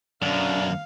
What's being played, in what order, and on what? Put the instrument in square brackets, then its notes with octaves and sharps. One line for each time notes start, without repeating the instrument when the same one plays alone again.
[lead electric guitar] F#2 [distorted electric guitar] B2 D3 [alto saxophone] D4 [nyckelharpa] F5